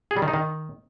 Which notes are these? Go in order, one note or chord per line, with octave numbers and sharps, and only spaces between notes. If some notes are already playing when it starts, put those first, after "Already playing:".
G#4
G3
D#3
D#4
D#3